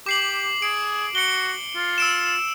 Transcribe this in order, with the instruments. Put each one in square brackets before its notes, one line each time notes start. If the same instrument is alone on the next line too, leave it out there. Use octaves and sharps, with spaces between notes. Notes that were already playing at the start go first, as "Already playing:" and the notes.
[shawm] G4 [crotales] D6 C7 F#7
[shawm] G#4 [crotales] D7
[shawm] F#4 [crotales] C#7 G7
[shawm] F4
[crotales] E6 D7 E7